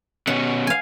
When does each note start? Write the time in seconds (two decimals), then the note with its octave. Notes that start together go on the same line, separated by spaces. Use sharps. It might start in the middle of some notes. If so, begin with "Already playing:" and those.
0.27 B2 C#4 F#5
0.67 F5 G#5